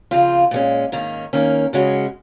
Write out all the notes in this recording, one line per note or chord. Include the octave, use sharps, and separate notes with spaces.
C#3 F3 C4 F4
A#2 G#3 C#4
G#2 D#3 A#3 C#4
D#2 D#3 A#3 C#4
C#3 G#3 C#4 F#4